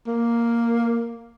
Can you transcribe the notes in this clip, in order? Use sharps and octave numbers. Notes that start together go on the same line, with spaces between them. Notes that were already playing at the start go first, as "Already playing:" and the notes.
A#3